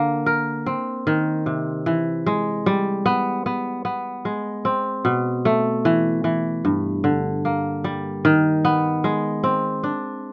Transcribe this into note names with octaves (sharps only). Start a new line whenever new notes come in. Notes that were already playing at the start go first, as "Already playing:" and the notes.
Already playing: D3 A#3
A#4
C4
D#3
C3
E3
G#3
G3
B3
B3
B3
G#3
C4
B2
A3
E3
E3
G2
D3
A#3
G3
D#3
B3
G#3
C4
D4